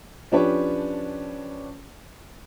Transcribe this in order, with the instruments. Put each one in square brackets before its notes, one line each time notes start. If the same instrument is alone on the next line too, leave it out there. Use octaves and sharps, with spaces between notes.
[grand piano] F3 C#4 D4 G4 B4 C#5